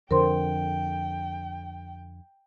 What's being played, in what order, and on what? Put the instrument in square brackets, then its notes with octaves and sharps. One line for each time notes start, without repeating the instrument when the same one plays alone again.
[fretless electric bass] F2 D3 [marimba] A#4 C5 C6 [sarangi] G5